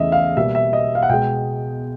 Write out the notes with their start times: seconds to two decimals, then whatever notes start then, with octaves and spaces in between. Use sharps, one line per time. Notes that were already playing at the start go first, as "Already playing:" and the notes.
Already playing: E2 C#3 E3 A3 D#5 E5
0.12 F5
0.36 B2 G3 A#3 E5
0.55 E5
0.73 D#5
0.95 F5
1.02 F#5
1.09 B2 G#3 G5